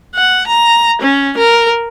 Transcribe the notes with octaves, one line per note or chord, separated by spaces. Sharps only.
F#5
A#5
C#4
A#4